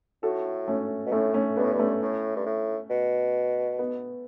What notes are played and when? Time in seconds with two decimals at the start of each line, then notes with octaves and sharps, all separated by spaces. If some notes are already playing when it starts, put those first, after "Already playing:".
0.23 A2 F#4 A4
0.68 A3 C#4
1.06 B2
1.12 A2 A3 C#4
1.34 A3 C#4
1.57 G2 B3
1.64 A2
1.71 G2
1.79 A3 C#4
2.01 A2
2.36 G2
2.46 A2
2.90 B2
3.79 B3